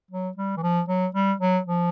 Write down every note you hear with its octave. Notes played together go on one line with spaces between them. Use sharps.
F#3
G3
E3
F3
F#3
G3
F#3
F3